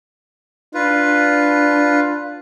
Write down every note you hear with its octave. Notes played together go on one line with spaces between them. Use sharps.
D4 F4 B4